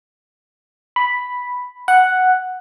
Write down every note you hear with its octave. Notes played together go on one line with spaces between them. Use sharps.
B5
F#5